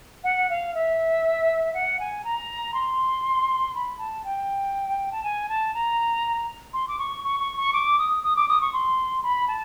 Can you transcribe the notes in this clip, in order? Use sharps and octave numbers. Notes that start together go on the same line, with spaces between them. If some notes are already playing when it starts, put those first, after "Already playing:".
F#5
F5
E5
F#5
G#5
A#5
C6
B5
A5
G5
A5
G#5
A5
A#5
C6
D6
C#6
C#6
C#6
C#6
D6
D#6
D#6
D6
D#6
C#6
C6
B5
A5